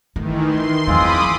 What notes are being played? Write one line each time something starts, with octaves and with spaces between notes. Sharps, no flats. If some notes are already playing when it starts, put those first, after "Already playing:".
D#3 E3 A3
C6
E2 F#3 G#3 C4 F4 B5 D6 D#6